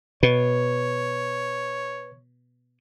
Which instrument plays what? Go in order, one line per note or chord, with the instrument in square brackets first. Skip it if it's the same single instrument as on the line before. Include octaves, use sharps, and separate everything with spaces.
[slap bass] B2 [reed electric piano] B4 [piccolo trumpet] C#5